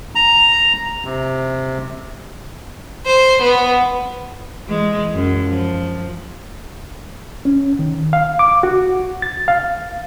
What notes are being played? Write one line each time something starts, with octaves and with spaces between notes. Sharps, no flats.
A#5
C3
C5
B3
E3 G#3
F#2
F3
C#4
D#3
F5
D6
F#4
A6
F5